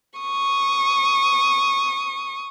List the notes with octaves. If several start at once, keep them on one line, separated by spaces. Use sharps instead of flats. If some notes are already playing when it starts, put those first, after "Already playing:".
C#6 D#6